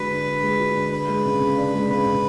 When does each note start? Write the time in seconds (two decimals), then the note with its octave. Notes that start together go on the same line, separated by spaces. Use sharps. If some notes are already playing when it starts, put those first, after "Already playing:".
Already playing: D3 G#3 D4 F#4 B4
0.11 D3
0.27 D4
0.43 G#3
0.60 F#4
0.75 D3
0.92 D4 B4
1.08 G#3
1.25 C#3
1.40 C#3
1.57 D4
1.74 G#3
1.90 C#3 B4
2.06 C#3